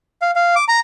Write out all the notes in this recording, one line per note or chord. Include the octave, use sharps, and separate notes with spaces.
F5
F5
D6
A#5